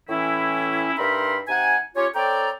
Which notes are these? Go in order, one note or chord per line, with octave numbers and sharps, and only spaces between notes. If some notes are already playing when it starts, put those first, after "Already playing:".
A2 E3 C#4 E4
G2 D#4 A#4 E5 B5 C6
C3 D#4 F#5 G#5
C#4 F4 G4 C#5
C4 A4 C#5 D5 G5 A#5